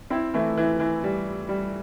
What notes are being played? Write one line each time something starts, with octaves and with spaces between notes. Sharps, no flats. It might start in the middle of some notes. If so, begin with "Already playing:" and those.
C4 E4
E3 A3
E3
E3
G3
G3